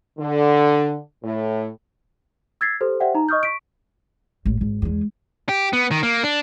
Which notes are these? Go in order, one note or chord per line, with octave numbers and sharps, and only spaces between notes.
D3
A2
E6 G#6 A6 B6 C7
G4 A4 C5
G4 C5 D5 E5 F#5 G5
D#4 A#5
D#5 C#6 D#6 F6 G6
C#6 B6 D7
A1
G#1
E2 G#3
G4
B3
D#3
A#3
D4